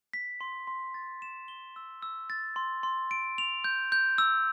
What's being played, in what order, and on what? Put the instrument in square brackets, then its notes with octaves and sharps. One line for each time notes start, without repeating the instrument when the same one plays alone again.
[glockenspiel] B6
C6
C6
A6
E7
G7
E6
E6
A6
C6
C6
D7
F7
G6
G6
E6